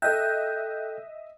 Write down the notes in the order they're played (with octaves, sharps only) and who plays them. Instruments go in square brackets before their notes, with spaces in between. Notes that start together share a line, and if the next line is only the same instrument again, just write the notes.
[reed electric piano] A4 G5 [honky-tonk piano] D#5 E5 [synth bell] F#6 G6